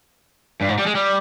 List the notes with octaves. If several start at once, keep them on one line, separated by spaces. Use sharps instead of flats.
G2
G#2
G3
G#3
G3